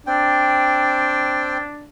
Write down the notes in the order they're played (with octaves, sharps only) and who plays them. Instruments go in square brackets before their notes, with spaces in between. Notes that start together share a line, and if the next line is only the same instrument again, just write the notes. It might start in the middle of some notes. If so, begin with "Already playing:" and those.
[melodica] C4 G5 [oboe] D4